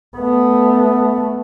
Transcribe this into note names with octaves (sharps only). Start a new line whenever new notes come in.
A3 B3